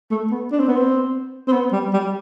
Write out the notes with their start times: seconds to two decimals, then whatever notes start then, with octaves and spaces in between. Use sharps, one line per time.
0.10 A3
0.31 B3
0.51 D4
0.59 C4
0.68 B3
0.77 C4
1.47 C4
1.52 B3
1.72 G3
1.93 G3